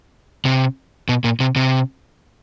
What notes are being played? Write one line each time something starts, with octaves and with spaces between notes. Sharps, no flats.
C3
B2
A#2
C3
C3